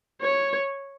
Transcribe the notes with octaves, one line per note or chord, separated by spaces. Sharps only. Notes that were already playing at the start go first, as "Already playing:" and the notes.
C#5